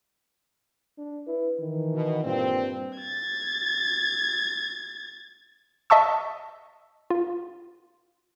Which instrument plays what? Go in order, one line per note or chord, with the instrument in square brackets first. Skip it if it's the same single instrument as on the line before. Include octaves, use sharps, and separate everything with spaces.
[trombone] D4
[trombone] E4 [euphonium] B4
[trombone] D#3 [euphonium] E3
[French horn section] B2
[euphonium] G2 [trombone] A#2 [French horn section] C4
[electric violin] G#6 A6
[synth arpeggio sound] D#5 E5 A5 C#6 E6
F4